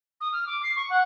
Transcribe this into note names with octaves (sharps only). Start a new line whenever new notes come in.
D#6
F6
D6
C7
C#6
F#5